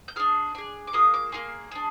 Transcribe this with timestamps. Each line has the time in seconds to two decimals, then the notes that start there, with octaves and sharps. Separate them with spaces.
0.08 G6
0.16 D4 G#4 F6
0.55 D4 G#4
0.87 D6
0.93 A#3 F4 G#4 D#6
1.14 D6
1.32 A#3 F4 G#4 C6
1.71 D4 G#4